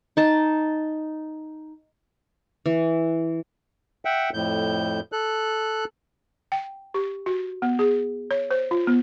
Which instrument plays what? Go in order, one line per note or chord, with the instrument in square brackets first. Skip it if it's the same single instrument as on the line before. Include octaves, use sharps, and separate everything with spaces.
[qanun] D#4 A5
E3
[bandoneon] E5 F#5 G5
F2 A2 G6
A4 F#6
[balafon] G5
G4
F#4
B3
G#4
C#5
C5
F4
B3